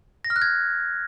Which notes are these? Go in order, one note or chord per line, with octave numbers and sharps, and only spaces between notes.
A#6
F6
F#6
G#6